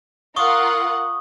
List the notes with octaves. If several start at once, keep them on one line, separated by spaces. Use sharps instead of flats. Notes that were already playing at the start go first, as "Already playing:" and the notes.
F4 A#4 F#5 C#6 D#6